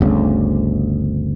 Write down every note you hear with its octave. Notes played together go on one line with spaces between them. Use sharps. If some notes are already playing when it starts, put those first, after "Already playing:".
G1 D2 C#3